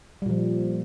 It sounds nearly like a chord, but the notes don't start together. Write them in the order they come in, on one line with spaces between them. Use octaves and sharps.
G3 A#2 F3